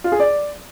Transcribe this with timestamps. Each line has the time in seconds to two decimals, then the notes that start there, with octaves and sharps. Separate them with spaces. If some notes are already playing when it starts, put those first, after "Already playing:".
0.04 F4
0.12 G#4
0.20 D5